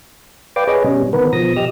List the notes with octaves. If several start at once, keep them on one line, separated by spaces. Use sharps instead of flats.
B4 D5 F5 G5 D6
G#4 B4 C#5 D#5
B2 G3 C#4
D#3 B3 A#4 B4
B2 F3 D#6 A#6
G4 D#5 E6 F6